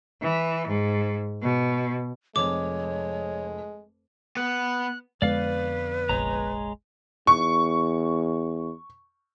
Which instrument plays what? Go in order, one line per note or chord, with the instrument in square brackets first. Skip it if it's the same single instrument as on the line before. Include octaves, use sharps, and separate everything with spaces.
[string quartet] E3
G#2
B2
[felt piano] F1 F2 [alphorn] G#3 [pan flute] C#5 [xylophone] D6
[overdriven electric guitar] B3 [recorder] F#6
[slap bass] F2 D3 B3 [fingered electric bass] G#3 [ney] B4 [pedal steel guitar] D5 F5
[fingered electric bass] F1 A#1 [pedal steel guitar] G#3 C#5 A#5
[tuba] E2 [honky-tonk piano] C#6